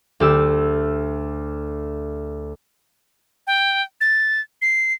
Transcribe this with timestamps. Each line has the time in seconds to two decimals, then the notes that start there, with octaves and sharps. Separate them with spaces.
0.20 D2 G4 E6
3.47 G5
4.01 A6
4.62 C7